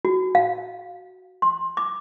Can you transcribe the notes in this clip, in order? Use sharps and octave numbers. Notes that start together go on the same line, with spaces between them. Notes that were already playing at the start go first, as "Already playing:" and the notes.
F#4
F5
C6
D6